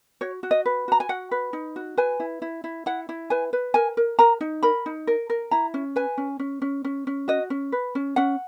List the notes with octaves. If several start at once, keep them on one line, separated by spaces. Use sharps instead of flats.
F#4 C#5
F#4
D#5
B4
F#4 A#5
G#5
F#4 F#5
B4
D#4
F#4
B4 G#5
E4
E4
E4
E4 F#5
E4
B4 G#5
B4
A#4 G#5
A#4
A#4 A#5
D#4
A#4 B5
D#4
A#4
A#4
E4 A#5
C#4
B4 G#5
C#4
C#4
C#4
C#4
C#4
F#4 D#5
C#4
B4
C#4
C#4 F#5